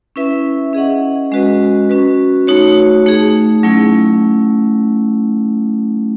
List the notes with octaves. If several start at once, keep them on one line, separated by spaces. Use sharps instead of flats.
C#4 E4 B4 E5
C#4 G#4 D#5 F#5
G#3 C#4 F#4 B4 D#5
C#4 F#4 B4
A3 D#4 F#4 C#5
A3 D#4 G#4
F#3 A3 C#4 E4